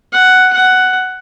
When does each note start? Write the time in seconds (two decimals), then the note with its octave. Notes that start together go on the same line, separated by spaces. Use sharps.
0.13 F#5
0.53 F#5